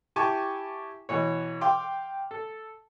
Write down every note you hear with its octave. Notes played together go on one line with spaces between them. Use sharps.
E4 G4 G#5 A5 C#6 D6
B2 E3 C#5
F5 G5 C6 D6
A4